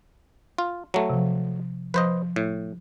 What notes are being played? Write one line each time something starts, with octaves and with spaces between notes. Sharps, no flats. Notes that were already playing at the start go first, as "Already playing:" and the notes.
F4
F#3 A3
C3 F3
F3 B4 C5 D#5
A2